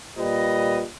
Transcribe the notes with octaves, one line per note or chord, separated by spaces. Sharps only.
A#2 G3 F4 B4 D#5 A#5